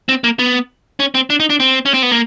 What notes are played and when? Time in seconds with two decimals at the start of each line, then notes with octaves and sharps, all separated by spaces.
0.09 C4
0.24 A#3
0.39 B3
1.00 C#4
1.15 C4
1.30 D4
1.40 D#4
1.50 D4
1.60 C4
1.85 C#4
1.94 C4
2.03 B3
2.11 A#3